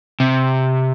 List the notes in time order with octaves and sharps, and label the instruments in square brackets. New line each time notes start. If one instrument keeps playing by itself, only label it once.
[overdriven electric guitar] C3